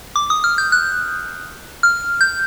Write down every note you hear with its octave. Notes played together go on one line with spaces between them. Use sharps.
D6
D#6
F6
G6
F#6
F6
G6